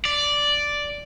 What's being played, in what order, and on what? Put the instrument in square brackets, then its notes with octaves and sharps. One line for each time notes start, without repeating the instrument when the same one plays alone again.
[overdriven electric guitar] D5